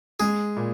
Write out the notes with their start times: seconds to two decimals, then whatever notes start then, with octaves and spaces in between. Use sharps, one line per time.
0.20 G#3 G#4
0.56 A#2